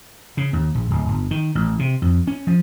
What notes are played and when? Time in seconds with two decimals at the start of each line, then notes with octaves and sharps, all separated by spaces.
0.37 C#3
0.53 D#2
0.75 A#1
0.91 D1
1.09 G1
1.31 D#3
1.55 A1
1.79 C3
2.02 F2
2.27 C#4
2.47 F3